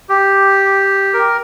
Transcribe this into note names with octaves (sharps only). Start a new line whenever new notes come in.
G4
A#4